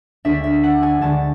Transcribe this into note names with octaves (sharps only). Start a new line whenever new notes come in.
D2 D3 G#3 D4 E5
E5
F#5
G#5
D2 D3 G#3 D4 A5